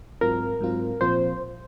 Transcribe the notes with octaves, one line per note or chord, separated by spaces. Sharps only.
G#2 F#3 C4 F4 A#4
G#2 F#3 C4 F4
A#2 F3 C4 F4 C5